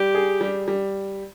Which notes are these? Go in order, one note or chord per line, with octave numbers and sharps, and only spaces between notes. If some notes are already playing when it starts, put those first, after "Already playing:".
Already playing: G3 G4
G#4
G3
G3